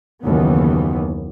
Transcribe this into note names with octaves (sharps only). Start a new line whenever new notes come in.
F#1 D#2 E3 B3